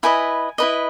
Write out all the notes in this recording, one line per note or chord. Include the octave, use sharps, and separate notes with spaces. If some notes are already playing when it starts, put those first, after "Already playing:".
E4 B4 D#5 G#5
E4 B4 D#5